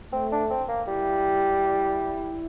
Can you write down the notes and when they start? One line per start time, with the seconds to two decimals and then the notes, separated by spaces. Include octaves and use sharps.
0.12 A3 C4
0.32 D4
0.50 C4
0.68 A#3
0.87 G3 E4